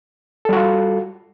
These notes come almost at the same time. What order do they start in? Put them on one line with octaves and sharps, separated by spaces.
A4 G3 F#4 F4